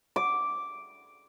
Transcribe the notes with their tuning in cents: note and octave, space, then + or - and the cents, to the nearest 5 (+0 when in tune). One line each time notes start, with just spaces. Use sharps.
D6 -5